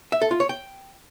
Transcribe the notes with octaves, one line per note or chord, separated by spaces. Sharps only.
E5
A4
F4
C#5
G5